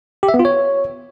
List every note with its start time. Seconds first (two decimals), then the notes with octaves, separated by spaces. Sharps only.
0.23 G4
0.28 E5
0.34 B3
0.39 F4
0.45 C#5